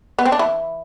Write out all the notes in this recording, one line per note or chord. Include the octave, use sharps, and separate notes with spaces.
B3
C4
D4
E3 E4